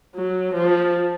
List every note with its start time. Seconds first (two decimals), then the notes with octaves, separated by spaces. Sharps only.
0.15 F#3
0.54 F3